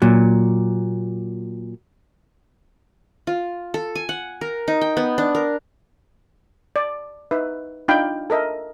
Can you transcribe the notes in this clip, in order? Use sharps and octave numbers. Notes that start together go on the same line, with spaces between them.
A#2 F#3
F4
A4
G#5
F#5
A#4
D#4
G5
B3
D4
A#4
D5
D#4 B4 E5
D4 D#4 F4 F5 G5 B5
A4 A#4 D#5 E5